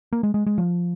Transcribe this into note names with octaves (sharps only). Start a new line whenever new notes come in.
A#3
G#3
G#3
G#3
F3